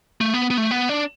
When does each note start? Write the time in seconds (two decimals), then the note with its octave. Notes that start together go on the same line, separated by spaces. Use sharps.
0.21 A3
0.34 B3
0.50 B3
0.57 A3
0.71 B3
0.89 D4